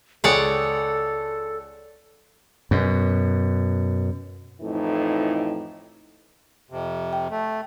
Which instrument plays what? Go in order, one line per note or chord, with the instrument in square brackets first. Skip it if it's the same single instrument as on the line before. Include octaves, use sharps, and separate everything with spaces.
[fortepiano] C#2 G#4 G5 [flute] A4 [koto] C#5 D5 F#5
[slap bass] F#2 B2
[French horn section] F2 A2 E3 D#4
[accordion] F2 C3
[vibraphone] G5
[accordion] A3